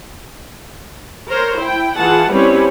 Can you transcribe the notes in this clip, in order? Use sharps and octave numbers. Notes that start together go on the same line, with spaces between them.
A#4 C5 C#5
E4 G5
E3 F4 G#4 F#5 A5
G3 C4 C#4 E4 B4 C#5